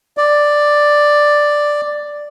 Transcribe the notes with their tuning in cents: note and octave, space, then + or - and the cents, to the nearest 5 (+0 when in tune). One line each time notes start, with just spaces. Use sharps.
D5 +5